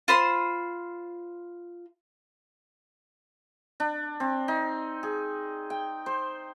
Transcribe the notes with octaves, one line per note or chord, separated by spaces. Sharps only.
F4 C5 B5 C6
D4
C4
D#4
G#4
G5
C5